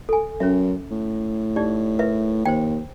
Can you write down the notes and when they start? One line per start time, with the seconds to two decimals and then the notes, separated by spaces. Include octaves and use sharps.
0.09 A4 G#5
0.40 F#2 C#4 E5
0.91 A2
1.56 D#4 G4 D5
1.99 A#4 B4 E5
2.46 D#2 C5 G5